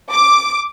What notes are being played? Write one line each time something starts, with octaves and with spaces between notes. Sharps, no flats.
D6